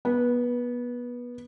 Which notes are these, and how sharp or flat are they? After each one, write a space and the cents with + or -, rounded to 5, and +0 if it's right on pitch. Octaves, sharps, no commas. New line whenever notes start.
B3 -20